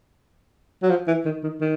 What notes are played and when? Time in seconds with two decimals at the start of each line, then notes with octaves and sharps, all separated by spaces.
0.83 F#3
0.90 F3
1.07 E3
1.25 D#3
1.43 D#3
1.61 D#3